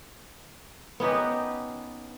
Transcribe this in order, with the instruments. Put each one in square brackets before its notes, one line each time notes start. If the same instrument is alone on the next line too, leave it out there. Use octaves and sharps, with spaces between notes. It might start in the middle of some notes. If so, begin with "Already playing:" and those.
[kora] B3 C#4 D#4 G4